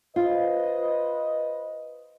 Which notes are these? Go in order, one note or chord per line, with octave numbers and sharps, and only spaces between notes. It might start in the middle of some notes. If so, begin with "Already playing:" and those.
F4 B4 C5 D#5